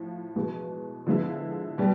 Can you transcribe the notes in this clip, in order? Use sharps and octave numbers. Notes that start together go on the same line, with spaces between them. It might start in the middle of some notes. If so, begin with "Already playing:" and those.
Already playing: A2 F3
E2 B2 G#3
D3 F3 G#3 B3 E4
B2 G3